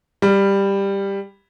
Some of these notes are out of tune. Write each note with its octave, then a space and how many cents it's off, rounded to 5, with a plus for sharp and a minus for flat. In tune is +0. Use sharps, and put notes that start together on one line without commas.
G3 +10